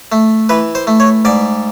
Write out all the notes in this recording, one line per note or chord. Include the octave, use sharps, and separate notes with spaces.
A3
E3 B4
C5
A3
C#5
G#2 D5